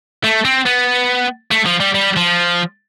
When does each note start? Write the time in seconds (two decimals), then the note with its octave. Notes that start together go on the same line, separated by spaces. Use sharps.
0.24 A3
0.45 C4
0.66 B3
1.51 A3
1.66 F3
1.80 G3
1.94 G3
2.16 F3